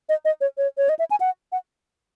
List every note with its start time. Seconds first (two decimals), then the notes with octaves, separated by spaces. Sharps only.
0.09 D#5
0.25 D#5
0.41 C#5
0.58 C#5
0.78 C#5
0.89 D#5
0.99 E5
1.11 G#5
1.20 F#5
1.52 F#5